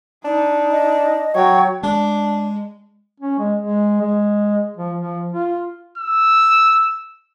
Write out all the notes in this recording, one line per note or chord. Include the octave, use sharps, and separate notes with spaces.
D4 D#4
D#5
F#3 C#5 G5
G#3 D4
C#4
G#3
G#3
G#3
F3
F3
F4
E6